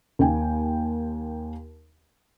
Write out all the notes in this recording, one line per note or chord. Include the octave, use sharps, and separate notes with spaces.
D#2 A#3 G5 G#5